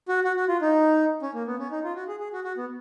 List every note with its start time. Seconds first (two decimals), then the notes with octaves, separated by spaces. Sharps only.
0.08 F#4
0.24 F#4
0.36 F#4
0.49 F4
0.62 D#4
1.22 C#4
1.34 A#3
1.47 B3
1.59 C#4
1.71 D#4
1.84 F4
1.95 F#4
2.08 G#4
2.20 G#4
2.33 F#4
2.44 F#4
2.57 B3